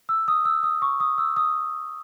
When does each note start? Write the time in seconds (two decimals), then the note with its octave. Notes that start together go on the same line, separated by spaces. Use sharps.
0.09 E6
0.28 D#6
0.45 E6
0.63 D#6
0.82 C#6
1.00 D#6
1.18 E6
1.36 D#6